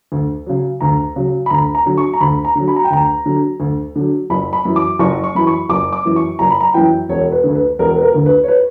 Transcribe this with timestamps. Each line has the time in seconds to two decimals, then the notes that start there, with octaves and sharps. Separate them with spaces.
0.12 D2
0.46 C#3 F#3
0.81 D2 A#5
1.16 C#3 F#3
1.46 B5
1.50 D2 A#5
1.75 A#5
1.86 D3 F#3
1.97 C#6
2.14 A#5
2.21 D2 B5
2.45 A#5
2.55 D3 F#3
2.68 B5
2.76 A#5
2.85 G5
2.91 D2 A#5
3.26 D3 F#3
3.60 D2
3.95 D3 F#3
4.30 F#1 B5
4.53 B5
4.65 F#2 E3
4.76 D6
4.99 F#1 C#6
5.24 C#6
5.35 F#2 E3 B5
5.47 C#6
5.69 F#1 D6
5.93 D6
6.05 F#2 E3
6.16 C#6
6.39 F#1 A#5
6.50 B5
6.60 A#5
6.74 F#2 E3 G5
7.09 E1 C#5
7.32 B4
7.44 D2 D3
7.55 B4
7.79 E1 A#4
7.97 B4
8.02 A#4
8.15 D2 D3
8.26 B4
8.44 C#5
8.48 B4